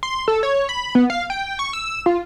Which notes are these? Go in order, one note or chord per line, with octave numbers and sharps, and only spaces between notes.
C6
A4
C#5
B5
B3
F5
G5
C#6
E6
F4